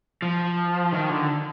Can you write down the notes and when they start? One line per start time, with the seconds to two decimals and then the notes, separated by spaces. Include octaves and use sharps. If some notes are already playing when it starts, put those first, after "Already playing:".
0.22 F3
0.93 D#3
1.09 D3